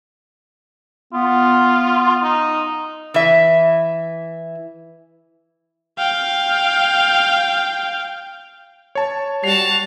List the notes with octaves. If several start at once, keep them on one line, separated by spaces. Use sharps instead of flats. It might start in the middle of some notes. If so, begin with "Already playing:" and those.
B3 F4
D#4
E3 E5
F5 G5
C#5 A5
G3 F#4 A5 C7 F7